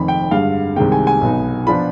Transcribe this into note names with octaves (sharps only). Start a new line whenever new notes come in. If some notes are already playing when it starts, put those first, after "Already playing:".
Already playing: F1 F2 D#3 B5
G5
G2 D3 G#3 F5
C2 C3 D#3 G#3 G5
G#5
G#5
B1 B2 B3 D#4
F3 B3 D4 F4 B5